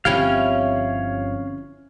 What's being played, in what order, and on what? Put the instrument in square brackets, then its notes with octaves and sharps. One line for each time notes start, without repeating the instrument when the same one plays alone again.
[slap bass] G1 F3 C4 [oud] C#4 E4 G4 [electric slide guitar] C#5 F5